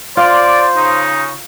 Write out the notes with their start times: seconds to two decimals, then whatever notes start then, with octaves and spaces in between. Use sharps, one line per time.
0.17 F4 C5 D5
0.75 C#3 D#4